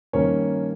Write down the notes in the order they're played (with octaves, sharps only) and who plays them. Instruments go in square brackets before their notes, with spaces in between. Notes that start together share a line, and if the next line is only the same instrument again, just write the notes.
[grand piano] G2 D#3 A#3 C#4 C#5